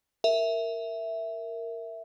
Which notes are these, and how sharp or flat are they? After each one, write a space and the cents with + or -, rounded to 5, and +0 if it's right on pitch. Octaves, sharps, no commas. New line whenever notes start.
A#4 -10 E5 +0